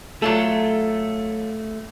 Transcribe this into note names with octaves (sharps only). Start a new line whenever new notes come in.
F#3 A3 F4 A4